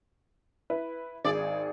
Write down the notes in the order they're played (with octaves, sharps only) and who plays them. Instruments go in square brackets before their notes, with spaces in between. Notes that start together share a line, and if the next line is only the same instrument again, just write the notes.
[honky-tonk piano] E4 B4
[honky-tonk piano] G#1 G#4 [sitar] D5